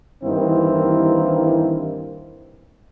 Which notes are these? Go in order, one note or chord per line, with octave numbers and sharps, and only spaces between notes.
G2 D#3 E3 A#3 C4 E4